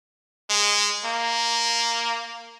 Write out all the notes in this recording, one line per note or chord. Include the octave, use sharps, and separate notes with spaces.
G#3
A#3